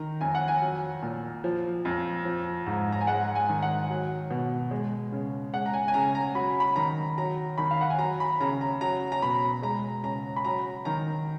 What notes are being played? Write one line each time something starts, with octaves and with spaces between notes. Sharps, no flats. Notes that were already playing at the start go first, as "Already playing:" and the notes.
Already playing: D#3 A#5
F2 G#5
F#5
G#5
F#3
A#2
F3
F2
F3
G#2
A#5
G#5
G#3 F#5
G#5
D#3
F#5
F#3
B2
G#3
C#3
G#3 F#5
A#5
G#5
G#5
C#3 A#5
A#5
F#3 B5
B5
D#3 A#5
F#3 A#5
D#3 B5
F5
F#5
G#5
F#3 A#5
B5
C#3 A#5
A#5
F#3 A#5
A#5
B2 B5
G#3 A#5
C#3 A#5
B5
F#3 A#5
D#3 A#5